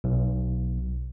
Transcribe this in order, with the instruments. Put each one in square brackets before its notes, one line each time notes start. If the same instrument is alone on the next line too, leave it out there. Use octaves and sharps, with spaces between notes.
[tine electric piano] B1